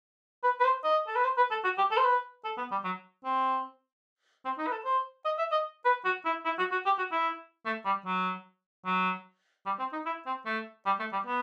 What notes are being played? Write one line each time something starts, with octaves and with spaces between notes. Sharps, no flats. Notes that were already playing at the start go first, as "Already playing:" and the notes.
B4
B4
C5
D#5
A4
B4
C5
B4
A4
F#4
G4
A4
C5
B4
A4
B3
G3
F#3
C4
C4
D#4
B4
A4
C5
D#5
E5
D#5
B4
F#4
E4
E4
F#4
F#4
G4
F#4
E4
A3
G3
F#3
F#3
G3
C4
D#4
E4
C4
A3
G3
A3
G3
B3